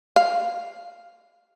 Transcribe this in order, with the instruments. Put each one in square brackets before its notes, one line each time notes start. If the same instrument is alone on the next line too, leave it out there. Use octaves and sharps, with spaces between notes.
[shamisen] F5